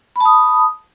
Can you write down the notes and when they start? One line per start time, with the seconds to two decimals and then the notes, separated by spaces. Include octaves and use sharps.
0.16 B5
0.21 A5
0.25 D#6